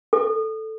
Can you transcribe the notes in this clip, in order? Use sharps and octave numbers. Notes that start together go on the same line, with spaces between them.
A4